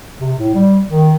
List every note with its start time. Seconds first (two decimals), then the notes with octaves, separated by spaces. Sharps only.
0.20 C3
0.36 A2
0.55 G3
0.88 D#3